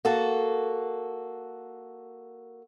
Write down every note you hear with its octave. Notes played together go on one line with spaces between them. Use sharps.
A#3 F#4 A4